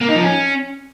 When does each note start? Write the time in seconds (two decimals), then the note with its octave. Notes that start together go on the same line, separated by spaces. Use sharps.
0.01 A#3
0.08 D#4
0.16 F3
0.23 C#4